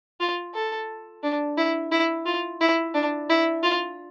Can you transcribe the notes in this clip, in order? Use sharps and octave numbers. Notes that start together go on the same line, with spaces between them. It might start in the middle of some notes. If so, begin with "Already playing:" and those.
F4
A4
D4
E4
E4
F4
E4
D4
E4
F4